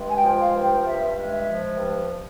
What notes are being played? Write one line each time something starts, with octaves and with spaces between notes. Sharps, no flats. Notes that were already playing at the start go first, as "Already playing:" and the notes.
Already playing: G2 G#3
G#5
G5
F3
F5
G2
G5
G2 E5
G#3
E5
F3
G2